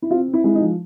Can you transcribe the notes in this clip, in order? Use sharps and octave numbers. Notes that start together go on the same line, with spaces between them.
E4
C4 F4
C4
E4
G#3 E4
D#4
F3